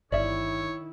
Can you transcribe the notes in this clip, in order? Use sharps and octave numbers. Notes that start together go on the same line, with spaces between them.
G1 D#3 E4 C#5 D5 E5